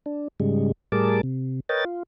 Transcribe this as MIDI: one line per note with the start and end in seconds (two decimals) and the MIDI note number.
0.06 0.28 62
0.40 0.72 44
0.40 0.72 49
0.40 0.72 55
0.40 0.72 56
0.92 1.21 45
0.92 1.21 55
0.92 1.21 68
0.92 1.21 70
0.92 1.21 81
0.92 1.21 86
1.23 1.60 48
1.69 1.85 70
1.69 1.85 71
1.69 1.85 73
1.69 1.85 75
1.69 1.85 79
1.69 1.85 93
1.85 2.03 65